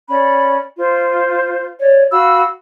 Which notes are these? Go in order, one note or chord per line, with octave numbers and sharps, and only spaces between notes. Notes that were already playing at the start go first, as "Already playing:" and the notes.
C#4 D5 B5
F4 C5
C#5 D5
F#4 F5 B5 E6